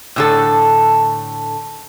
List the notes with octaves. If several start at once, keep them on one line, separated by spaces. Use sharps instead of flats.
A2 D3 A4